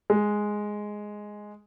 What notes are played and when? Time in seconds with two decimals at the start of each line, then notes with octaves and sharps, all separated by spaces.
0.10 G#3